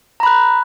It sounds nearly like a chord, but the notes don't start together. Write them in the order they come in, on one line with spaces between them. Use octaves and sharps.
A#5 B5 F#6